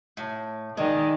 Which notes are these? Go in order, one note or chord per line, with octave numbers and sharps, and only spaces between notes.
A2
D#3 G#3 D5 D#5